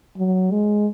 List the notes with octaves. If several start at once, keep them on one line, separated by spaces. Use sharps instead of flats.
F#3
G#3